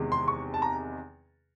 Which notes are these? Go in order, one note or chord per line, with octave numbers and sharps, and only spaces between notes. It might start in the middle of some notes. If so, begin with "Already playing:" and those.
Already playing: E2 C3 D#3 G#3
C6
C#6
A5
A#5